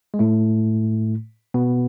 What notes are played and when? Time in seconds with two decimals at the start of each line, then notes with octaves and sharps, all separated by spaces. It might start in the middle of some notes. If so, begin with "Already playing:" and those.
0.14 G#3
0.19 A2 A3
1.54 B2 B3